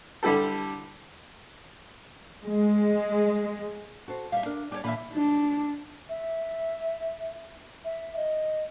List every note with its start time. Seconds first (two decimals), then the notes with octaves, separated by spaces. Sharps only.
0.23 D3 G3 E4 G4 A4
2.44 G#3
4.08 F#4 A4 C5
4.32 G3 E5 F5
4.46 D4 A#4
4.72 G3 D4 G4 C#5 D5
4.84 A#2 D3 E3 E5 F5 B5
5.14 D4
6.09 E5
7.85 E5
8.16 D#5